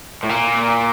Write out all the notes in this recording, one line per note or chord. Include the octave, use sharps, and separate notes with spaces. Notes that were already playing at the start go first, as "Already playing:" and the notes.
A2
A#2